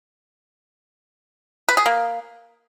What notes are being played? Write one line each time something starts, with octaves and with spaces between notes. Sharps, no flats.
B4
G#4
A#3